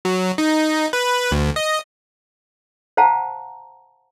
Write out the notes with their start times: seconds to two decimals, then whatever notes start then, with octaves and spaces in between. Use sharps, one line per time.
0.05 F#3
0.38 D#4
0.93 B4
1.32 D2
1.56 D#5
2.97 C5 F5 F#5 A5 A#5